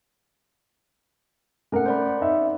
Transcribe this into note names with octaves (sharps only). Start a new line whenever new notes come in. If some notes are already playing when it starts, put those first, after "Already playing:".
A3 C#4 A#4 F#5
C5 D5 B5
D#4 E5